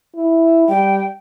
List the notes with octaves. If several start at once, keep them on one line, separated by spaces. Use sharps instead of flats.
E4
G3 G5